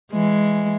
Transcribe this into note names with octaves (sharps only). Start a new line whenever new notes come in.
E3 G#3